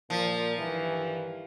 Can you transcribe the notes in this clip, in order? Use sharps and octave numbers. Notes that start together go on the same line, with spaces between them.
A#2 F3
G2 D#3 E3